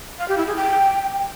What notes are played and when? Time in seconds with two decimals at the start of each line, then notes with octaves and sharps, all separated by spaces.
0.19 F5
0.28 G4
0.38 E4
0.47 G#4
0.56 G5